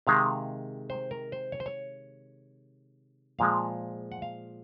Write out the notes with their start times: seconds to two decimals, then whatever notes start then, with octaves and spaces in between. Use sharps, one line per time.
0.07 C3 D#3 G#3 F5
0.90 C5
1.11 A#4
1.32 C5
1.52 C#5
1.60 C5
1.66 C#5
3.39 A#2 F3 G#3 F5
4.12 F#5
4.22 F5